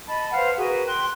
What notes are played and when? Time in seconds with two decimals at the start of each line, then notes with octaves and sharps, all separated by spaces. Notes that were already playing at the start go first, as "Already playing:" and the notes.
0.07 D#5 A5 B5
0.32 B4 C5 F5 F#5
0.58 F#4 G#4 A#4 B4
0.86 G5 C6 F#6